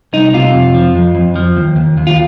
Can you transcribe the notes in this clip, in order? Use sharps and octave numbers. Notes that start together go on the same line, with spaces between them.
C2 D#4
C3 F4
F2
F3
F2
F2
F3
D#2
D#2
D#2
F4